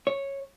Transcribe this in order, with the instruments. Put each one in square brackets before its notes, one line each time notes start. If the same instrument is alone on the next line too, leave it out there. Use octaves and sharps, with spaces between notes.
[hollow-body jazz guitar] C#5